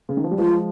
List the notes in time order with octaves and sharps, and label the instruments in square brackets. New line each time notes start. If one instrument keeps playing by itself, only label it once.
[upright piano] C#3
D#3
F3
G3
[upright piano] F3 G#3 [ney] F4